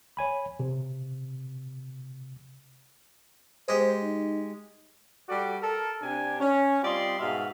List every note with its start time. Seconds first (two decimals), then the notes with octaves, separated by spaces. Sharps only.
0.17 C#5 G#5 B5
0.60 C3
3.69 G#3 G4 C5
4.02 D#4
5.29 G3 F#4 A4 D5
5.61 A4 A#4
6.02 C3 D4 G#5
6.40 C#4
6.83 G3 C4 F4 D5 D#5 C6
7.19 G#2 B2 F#4 E5 F5